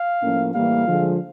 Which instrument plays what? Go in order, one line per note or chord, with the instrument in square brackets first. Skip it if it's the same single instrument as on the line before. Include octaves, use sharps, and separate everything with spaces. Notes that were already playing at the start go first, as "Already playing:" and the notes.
Already playing: [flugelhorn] F5
[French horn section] A2 F3 A#3 C#4
[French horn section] A2 E3 G3 A#3 [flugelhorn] F5
[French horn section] D3 F3 G#3